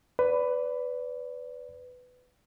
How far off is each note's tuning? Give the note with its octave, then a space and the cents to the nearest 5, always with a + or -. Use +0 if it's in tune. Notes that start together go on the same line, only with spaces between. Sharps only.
B4 +15 D5 -20